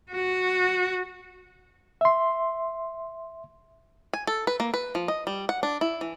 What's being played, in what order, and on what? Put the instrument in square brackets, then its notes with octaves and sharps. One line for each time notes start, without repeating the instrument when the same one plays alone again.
[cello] F#4
[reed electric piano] E5 C6
[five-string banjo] G#5
A4
B4
A#3
B4
F3
D#5
G3
F#5
D4
E4
E3